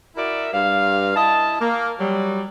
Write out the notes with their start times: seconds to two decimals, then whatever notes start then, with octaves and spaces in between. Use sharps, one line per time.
0.16 E4 F#4 A#4 D5 E5
0.53 G2 F5
1.15 E4 D#5 A5
1.60 A#3
1.99 F#3 G3